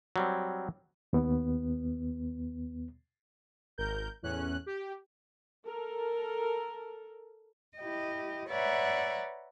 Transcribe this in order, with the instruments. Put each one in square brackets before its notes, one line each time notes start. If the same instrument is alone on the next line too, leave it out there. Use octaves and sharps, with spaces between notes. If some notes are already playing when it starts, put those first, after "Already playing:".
[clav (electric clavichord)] F#3 G3 C4
[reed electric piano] D#2 B3
[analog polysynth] G#1 A#4 G6
E2 A2 C#4 F#6
G4
[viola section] A4 A#4
[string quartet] E4 G4 D#5
B4 C#5 D5 E5 F#5 A#5